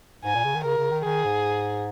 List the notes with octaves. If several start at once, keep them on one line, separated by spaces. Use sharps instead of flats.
G#2 G#5
A#2
C#3
D#3
C#3 A#4
C#3
D#3
D#3 G#4
G#2